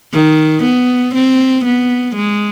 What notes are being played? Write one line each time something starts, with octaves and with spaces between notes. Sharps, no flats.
D#3
B3
C4
B3
G#3